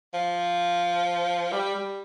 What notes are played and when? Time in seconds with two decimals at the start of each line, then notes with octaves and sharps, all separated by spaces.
0.14 F3
1.52 G3
1.75 G3